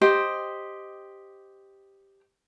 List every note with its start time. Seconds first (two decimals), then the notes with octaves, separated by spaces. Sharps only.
0.01 G4 C5 D#5 G5